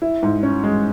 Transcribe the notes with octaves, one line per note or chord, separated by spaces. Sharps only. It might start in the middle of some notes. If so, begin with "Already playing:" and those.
E4
G#2
C#4
G#3